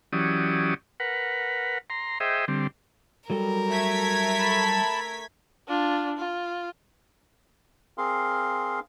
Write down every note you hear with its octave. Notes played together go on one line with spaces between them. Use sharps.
E3 F#3 C#4 G4 D5 D#6
A#4 B4 F#5
A#5 C6
G#4 C5 D#5 E5 G5
D3 G3 C4
F#3 G3 A4 A#4
A3 G#6 B6
A5 B5
D4 F4
F4
C4 G#4 A#4 F5 C6